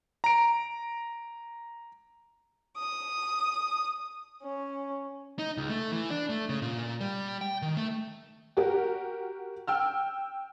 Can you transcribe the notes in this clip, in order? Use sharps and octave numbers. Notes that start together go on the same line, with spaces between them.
A#5 D7
D#6
C#4
D#4
C#2
A3
E3
D4
A3
C#3
A#2
G3
G5
D#3
A3
F#4 G4 A#4
G5 E6 F6